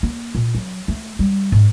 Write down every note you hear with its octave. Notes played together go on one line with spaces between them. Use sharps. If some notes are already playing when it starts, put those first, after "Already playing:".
A#3
A#2
F#3
A3
G3
G#2